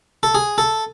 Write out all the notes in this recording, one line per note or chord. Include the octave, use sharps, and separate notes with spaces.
A4
G#4
A4